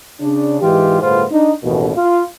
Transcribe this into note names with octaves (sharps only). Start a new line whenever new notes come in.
C#3 D4
G#2 E3 G#3 F4 G4
G1 A2 B3 F4 G#4 C5
D4 D#4
A1 D#2 B2
F4